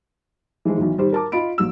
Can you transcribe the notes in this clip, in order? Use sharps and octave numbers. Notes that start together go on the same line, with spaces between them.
E3 F3 G#3
B1 D#3 E3
D#3 G3 G4 C5
A#4 A5 D6
F4 D#5 B5 D7
A#1 F#3 E6